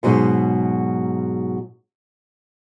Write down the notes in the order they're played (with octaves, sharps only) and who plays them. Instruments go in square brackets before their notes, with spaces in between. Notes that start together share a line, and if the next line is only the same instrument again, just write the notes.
[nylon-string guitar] G#2 B2 F#3 G#3 D#4